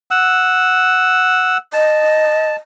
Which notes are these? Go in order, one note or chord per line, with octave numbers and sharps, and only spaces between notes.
F#5 E6
D#5 A5